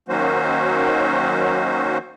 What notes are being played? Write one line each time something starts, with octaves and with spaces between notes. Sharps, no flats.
D#3 F#3 A#3 C#4 F#4 C5